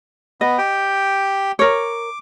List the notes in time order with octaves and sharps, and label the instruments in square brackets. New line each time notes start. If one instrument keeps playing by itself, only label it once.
[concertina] B3 [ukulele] D#5
[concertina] G4 G5
[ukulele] A#4 C#5 [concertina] D6